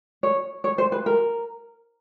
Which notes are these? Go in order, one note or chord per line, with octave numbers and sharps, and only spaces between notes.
C#5
C#5
C5
B4
A#4